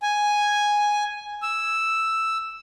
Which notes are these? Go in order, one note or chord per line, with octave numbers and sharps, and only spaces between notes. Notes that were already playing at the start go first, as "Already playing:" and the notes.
G#5
E6